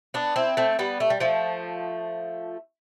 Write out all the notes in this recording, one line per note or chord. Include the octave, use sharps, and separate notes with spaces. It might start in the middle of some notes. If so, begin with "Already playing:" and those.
B3 D4
C4 E4
A3 C4
G3 B3
A3
G3
F3 A3